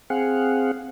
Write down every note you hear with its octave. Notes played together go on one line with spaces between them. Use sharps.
C4 G#4 F5 F#5